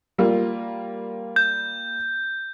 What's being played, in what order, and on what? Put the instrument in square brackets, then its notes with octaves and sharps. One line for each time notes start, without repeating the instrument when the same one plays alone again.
[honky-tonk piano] G3 A#3 F4
[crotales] G6